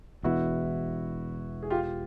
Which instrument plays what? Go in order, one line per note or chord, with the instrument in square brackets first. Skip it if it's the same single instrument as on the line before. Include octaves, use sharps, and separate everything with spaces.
[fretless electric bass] E1 E2 B2 [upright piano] E4 F#4
[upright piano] G#4
F4 G4